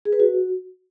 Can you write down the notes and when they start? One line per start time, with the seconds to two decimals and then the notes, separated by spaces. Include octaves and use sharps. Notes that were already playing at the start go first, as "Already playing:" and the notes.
0.05 G#4
0.13 B4
0.20 F#4